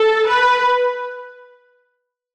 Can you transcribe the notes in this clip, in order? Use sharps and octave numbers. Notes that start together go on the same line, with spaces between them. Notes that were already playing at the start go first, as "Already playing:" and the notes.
Already playing: A4
B4